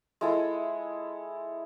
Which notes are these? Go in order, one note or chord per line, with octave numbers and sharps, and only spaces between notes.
G#3 E4 A4